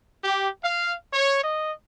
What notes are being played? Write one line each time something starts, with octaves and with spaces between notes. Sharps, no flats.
G4
F5
C#5
D#5